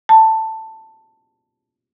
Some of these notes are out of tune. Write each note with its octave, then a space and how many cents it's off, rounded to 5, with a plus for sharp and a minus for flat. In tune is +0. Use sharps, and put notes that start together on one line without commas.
A5 +10